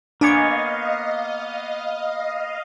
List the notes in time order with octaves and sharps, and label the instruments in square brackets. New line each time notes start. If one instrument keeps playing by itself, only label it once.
[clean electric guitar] A#3 B3 C#5 [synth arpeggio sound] D4 G#5 D6 [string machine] D#5 F5